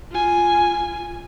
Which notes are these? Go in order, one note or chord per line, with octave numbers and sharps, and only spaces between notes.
F4 G#5